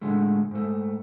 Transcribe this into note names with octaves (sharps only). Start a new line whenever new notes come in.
A2 D3 G#3 A3
G#2 A3